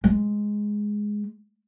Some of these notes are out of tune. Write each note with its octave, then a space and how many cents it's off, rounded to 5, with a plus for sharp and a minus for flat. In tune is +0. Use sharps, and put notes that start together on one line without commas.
G#3 +0